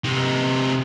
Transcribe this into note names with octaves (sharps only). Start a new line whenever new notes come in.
C3 D#4